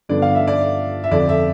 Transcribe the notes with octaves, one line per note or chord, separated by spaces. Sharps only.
G2 D3 F3 B3 D4 D5
F5
E5
D5
E5
F2 D3 F3 D5
E5